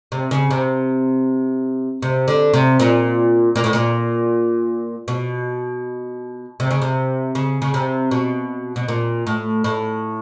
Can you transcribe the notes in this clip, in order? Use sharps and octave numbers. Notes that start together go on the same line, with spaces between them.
C3
C#3
C3
C3
D3
C3
A#2
A#2
A2
A#2
B2
C3
C#3
C3
C#3
C#3
C3
B2
B2
A#2
A2
A2